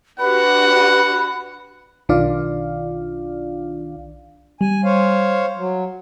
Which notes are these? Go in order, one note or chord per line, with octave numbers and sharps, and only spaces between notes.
D4 F#4 G4 B4 F#5 B5
B1 D#3 D4 F4 D5 F5
G3 G#5
C5 C#5 F5
F#3